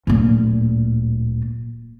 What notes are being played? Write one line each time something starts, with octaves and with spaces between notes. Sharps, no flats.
D1 A#2